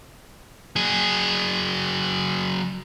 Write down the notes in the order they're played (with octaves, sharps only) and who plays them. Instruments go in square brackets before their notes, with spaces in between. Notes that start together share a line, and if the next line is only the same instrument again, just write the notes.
[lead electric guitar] F#3 G#4